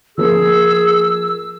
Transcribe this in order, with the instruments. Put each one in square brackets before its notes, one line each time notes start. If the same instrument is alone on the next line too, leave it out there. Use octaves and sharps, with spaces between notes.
[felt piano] F3 A#3 [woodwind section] G#4 [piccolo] E6